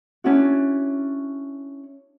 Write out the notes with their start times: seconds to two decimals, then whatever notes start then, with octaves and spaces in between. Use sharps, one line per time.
0.24 C#4 D4 E4 F#4